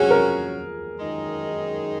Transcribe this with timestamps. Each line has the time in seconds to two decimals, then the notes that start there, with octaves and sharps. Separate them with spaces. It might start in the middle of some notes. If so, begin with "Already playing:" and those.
Already playing: C3 F#3 C#4 F#4 G#4
0.11 A#4
0.98 F#2 D#3 G#3 D#4 G#4